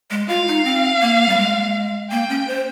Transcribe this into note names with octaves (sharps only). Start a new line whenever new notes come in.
G#3
F4 F5
D#4
C4
A#3
G3
G#3
A#3 G5
C#4
C5